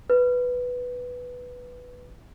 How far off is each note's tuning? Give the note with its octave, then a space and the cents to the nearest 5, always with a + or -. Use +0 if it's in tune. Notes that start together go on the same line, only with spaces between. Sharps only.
B4 +0